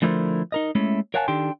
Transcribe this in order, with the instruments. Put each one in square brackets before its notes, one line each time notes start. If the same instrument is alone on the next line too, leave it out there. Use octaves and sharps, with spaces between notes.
[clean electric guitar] D3 F3 A3 E4 A#4 C5
D#4 A#4 D#5
G#3 A3 C#4 E4
A#4 C#5 F5 F#5 G#5 A5
D#3 D4 G4 A4 G5 C6